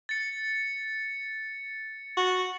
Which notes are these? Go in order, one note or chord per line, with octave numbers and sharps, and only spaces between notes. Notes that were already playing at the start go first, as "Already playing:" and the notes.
A6 C#7
F#4